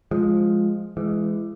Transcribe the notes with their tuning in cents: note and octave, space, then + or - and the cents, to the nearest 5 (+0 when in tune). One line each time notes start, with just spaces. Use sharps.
F3 +0 G#3 +0
E3 +30 G#3 +10